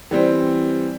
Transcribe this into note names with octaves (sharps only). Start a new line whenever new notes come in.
E3 G3 C4